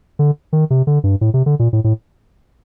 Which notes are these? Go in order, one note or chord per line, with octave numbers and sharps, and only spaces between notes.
D3
D#3
C3
D3
G2
A2
C3
D3
A#2
A2
A2